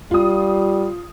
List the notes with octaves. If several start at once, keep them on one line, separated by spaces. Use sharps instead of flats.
G3 F4 D#6